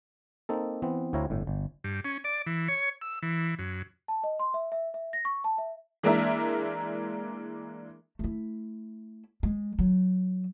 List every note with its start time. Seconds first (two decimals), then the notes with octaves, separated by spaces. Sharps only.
0.49 A#3 C4 D#4 A4
0.82 E3 B3 C4
1.13 D2 C4 E4 C#5 F5 A#5
1.30 G1 A2
1.47 G1
1.84 G2
2.05 C#4
2.24 D5
2.46 E3
2.68 C#5
3.01 E6
3.22 E3
3.59 F#2
4.08 A5
4.24 D#5
4.39 C6
4.54 E5
4.72 E5
4.94 E5
5.13 A#6
5.25 C#6
5.44 A5
5.58 E5
6.03 E3 G#3 A#3 D4 A#4 E5
8.19 A3 E4
9.43 G#3
9.79 F#3